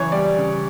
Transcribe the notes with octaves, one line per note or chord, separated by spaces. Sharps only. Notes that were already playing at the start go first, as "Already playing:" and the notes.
Already playing: C#3 E3 F#3 C#5
G3 D5
C#3